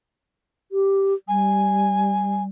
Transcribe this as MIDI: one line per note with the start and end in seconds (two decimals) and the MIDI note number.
0.72 1.14 67
1.28 2.47 55
1.28 2.43 80